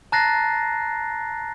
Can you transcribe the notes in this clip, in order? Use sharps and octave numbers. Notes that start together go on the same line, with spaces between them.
A5 A#5 F#6 A6 A#6 C7